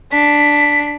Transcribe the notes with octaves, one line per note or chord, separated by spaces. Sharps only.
D4 B6